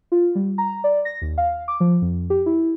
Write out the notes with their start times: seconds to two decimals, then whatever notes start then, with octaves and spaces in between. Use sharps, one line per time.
0.12 F4
0.35 G3
0.58 A#5
0.84 D5
1.05 A#6
1.22 D#2
1.38 F5
1.68 D6
1.80 F3
2.02 F2
2.30 G4
2.46 E4